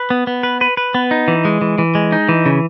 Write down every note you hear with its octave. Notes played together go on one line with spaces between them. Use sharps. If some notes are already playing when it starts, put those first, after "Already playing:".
Already playing: B4
B3
B3
B4
B4
B4
B3
D#4
E3
G#3
E3
E3
G#3
D#4
E3
C#3